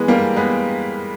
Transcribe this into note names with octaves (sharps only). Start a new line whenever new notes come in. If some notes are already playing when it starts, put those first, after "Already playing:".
Already playing: E3 G#3 B3
G3 A#3
G#3 B3